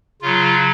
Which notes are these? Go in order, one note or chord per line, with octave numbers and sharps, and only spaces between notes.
C#3 F#3 F4